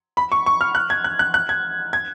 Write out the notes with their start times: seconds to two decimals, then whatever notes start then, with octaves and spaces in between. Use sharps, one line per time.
0.17 B5
0.32 C#6
0.46 C#6
0.61 F6
0.75 F#6
0.90 G#6
1.04 F#6
1.19 F#6
1.34 F#6
1.49 G#6
1.93 G#6